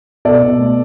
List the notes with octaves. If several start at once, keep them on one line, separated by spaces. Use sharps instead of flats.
B2 A4 D5
B2
A3